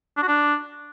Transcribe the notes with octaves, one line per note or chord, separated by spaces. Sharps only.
D4
F#4
D4